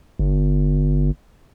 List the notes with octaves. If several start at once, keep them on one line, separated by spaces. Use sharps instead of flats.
G1